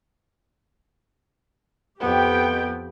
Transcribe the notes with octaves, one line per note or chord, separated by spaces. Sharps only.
F2 B3 G4 G5